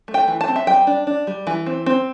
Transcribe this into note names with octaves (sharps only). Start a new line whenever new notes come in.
A3
G5
E3
A5
C4
E5
G3 G5
D4
D4
G3
E3
C4
C4